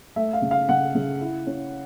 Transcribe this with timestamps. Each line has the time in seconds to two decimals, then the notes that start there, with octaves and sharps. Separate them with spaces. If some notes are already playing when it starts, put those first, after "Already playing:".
0.16 A3 E5
0.33 F5
0.42 C#3
0.51 F5
0.69 C#3 F#5
0.95 C#3
1.21 E4
1.47 C#4